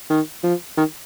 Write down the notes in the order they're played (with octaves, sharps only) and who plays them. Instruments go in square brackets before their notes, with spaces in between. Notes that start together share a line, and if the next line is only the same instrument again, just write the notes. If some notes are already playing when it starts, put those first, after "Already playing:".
[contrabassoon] D#3
F3
D#3